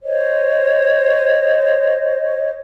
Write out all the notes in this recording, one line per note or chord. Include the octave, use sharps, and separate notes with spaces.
C5 C#5 D#5